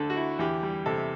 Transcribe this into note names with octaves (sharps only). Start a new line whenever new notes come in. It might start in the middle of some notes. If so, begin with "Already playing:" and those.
Already playing: D2 D3 A3 A4
F#4
E4
E2 G4
G3
C3 A4